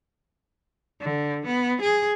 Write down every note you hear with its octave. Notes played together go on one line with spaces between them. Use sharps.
D3
B3
G#4